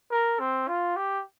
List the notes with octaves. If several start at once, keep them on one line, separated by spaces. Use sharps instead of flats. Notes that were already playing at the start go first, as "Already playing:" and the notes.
A#4
C4
F4
G4